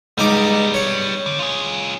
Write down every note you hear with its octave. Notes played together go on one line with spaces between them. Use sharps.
C#2 G3 B3 D#4 D6
C#5
D3
F4 G#4